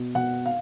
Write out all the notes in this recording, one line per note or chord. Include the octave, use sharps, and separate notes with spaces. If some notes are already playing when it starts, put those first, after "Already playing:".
Already playing: B2
B2 F#5
F5